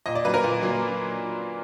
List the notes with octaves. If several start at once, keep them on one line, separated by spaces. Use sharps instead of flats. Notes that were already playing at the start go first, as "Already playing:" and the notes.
A#2 D#5
D5
F#3 A#3 B4
A#4
A#2
F#3 A#3